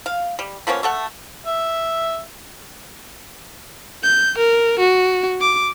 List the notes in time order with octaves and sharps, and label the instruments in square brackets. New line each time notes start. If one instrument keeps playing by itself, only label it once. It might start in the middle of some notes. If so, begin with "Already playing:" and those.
[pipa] F5
G3
F3 A#3 B3 C#4
A3 A4 F#5
[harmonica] E5
[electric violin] G6
A#4
F#4
D6